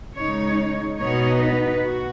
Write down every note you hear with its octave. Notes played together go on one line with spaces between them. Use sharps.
C#3 G#3 D#4 C#5
B2 B3 D#4 C#5
B4
F#4